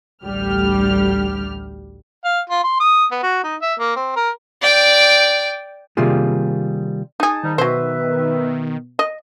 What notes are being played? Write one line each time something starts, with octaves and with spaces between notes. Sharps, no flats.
A1 D2 G3 G4 F6
F5
F4
C6
D#6
B3
F#4
D#4
E5
A#3
C4
A#4
D5 G5
C3 D#3 G3 A#3 F4 G#4
D#4 G#4 A5
G#2 D#3 G3 D#4
B2 F#3 B4 C5 E5
D#5